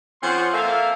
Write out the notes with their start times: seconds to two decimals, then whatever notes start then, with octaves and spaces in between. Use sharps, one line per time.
0.21 F3 C4 C#4 F#5 C6
0.52 A#3 A4 E5 F5